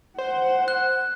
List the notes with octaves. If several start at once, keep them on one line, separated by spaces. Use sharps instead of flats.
C5 F#5
F#6